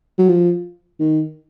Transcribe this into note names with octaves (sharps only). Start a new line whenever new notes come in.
F#3
F3
D#3